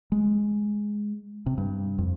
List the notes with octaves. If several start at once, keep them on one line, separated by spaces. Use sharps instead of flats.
G#3
C3
G2
F2